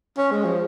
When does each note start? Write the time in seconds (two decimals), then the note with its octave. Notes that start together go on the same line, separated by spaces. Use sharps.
0.17 C#4
0.31 G#3
0.45 F3